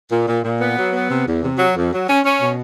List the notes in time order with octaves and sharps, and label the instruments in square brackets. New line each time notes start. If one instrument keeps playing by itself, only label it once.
[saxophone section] A#2
A#2
A#2
B3
F#3
B3
C3
E2
C3
F#3
F2
F#3
C#4
C#4
B2